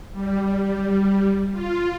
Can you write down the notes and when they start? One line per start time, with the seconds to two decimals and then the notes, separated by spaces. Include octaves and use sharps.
0.12 G3
1.52 F4